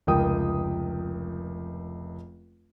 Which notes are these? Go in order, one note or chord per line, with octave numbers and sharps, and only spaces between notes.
F1 C#2 A#4 G5 D#6